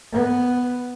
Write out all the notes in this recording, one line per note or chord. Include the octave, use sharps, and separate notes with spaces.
B3